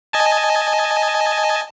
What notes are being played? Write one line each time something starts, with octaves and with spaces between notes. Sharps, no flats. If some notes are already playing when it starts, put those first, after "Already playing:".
D#5 G#5 A5